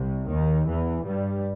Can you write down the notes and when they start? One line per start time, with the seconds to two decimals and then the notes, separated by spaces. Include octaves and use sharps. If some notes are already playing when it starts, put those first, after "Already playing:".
Already playing: C2 C3
0.29 D#2 D#3
0.66 E2 E3
1.04 G2 G3